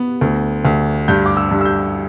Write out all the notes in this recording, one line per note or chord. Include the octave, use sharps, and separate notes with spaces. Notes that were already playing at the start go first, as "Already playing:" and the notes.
Already playing: B3
D2
D2
G2 G6
D6
E6
G2
E6
G6